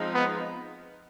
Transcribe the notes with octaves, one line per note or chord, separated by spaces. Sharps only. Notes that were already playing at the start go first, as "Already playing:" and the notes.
Already playing: F3 G#3 C4 D#4
B3